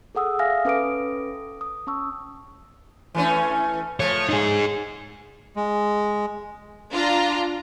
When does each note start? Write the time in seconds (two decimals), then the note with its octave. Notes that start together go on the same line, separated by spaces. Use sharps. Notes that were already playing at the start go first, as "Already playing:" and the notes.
0.15 G#4 A4 F#5 D#6 E6
0.39 E5 F5 G#5 F6 A#6
0.65 C#4 A4 B4 D6 D#6 D7
1.61 D#6
1.87 C#4 A5 C#6 E6
3.15 E3 A3 C#4
4.00 F3 A3 C#5
4.29 D#4 G#4
5.56 G#3
6.91 D4 F4 A#5